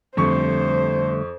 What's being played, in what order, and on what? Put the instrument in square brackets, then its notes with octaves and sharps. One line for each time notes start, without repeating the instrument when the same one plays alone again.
[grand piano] F2 C#6 [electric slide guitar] D3 G3 A3 [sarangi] C5